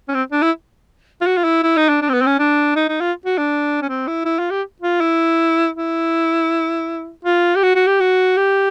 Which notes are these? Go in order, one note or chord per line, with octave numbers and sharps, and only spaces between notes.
C#4
C4
D4
E4
F4
F#4
F4
E4
E4
D#4
D4
D4
C4
B3
C4
C#4
D4
D#4
D#4
F4
F#4
D4
C#4
C4
E4
E4
F4
G4
F4
E4
E4
F4
G4
F#4
F#4
G4
F#4
G4